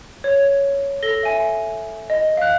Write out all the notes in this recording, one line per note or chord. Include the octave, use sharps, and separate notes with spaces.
C#5
A4 A#6 G7
E5 G#5
D#5
F5 F#6